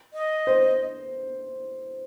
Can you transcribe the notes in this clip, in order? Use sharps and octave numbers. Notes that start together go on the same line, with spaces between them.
D#5
C5